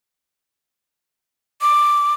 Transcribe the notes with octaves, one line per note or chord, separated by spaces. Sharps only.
D6